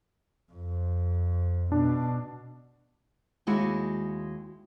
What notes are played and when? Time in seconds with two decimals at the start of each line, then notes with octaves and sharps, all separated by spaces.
0.52 F2
1.72 B2 D4
3.47 D#2 G#3 E4 F#4